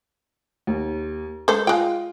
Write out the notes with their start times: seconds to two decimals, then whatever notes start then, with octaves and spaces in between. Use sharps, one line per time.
0.67 D#2
1.48 G#3 A4 C5
1.67 G#3 F4 G5